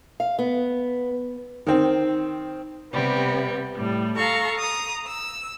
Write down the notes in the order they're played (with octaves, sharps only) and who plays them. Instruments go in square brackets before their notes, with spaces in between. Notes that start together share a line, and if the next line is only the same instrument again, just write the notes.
[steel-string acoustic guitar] F5
B3
[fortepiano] D#3 C4
[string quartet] C3 G3 B3
A2 G3
A4 F5 A#5 C#6
A#5 D#6
E6